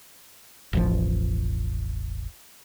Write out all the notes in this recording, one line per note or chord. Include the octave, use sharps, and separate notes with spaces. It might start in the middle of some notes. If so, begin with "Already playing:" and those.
E1 A1 F3